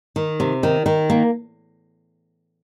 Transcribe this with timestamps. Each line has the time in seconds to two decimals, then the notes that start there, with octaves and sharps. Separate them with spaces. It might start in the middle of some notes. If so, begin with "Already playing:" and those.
0.16 D#3
0.40 C3
0.63 D#3
0.86 D#3
1.10 A#3